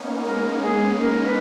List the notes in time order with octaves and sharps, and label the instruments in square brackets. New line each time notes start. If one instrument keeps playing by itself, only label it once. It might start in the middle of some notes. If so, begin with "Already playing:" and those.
Already playing: [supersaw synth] A#3 B3 C#4 D#4
[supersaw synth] G#3 B3 [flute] A#4
[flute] G#4
A#4
B4